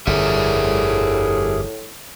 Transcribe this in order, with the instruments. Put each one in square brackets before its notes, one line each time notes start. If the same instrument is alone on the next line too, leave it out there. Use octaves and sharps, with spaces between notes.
[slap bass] G1 F2 D3 [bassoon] A2 [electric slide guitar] G4 A#4 E5 [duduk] G#4